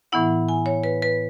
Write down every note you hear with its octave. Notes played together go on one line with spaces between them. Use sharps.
A2 E3 B3 E4 F#5
G#5
C#5
B4
B4